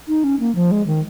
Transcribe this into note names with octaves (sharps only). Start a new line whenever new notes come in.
D#4
C#4
A#3
F3
G#3
D#3